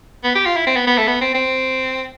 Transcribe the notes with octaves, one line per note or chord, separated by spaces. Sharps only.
B3
G4
F4
E4
C4
B3
B3
A3
B3
C4
C4